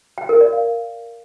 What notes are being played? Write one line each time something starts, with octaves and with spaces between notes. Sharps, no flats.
G5
A#4
D5
F5